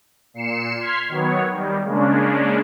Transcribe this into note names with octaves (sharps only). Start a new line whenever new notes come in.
A#2 C7 C#7 E7
C6 F6 G#6 B6 C7
D#3 F#3 B3 C#5
D#3 G3
C#3 G#3 A#3 C#4 D4